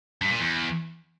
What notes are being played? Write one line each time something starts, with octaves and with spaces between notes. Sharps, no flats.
G2
A#2
E2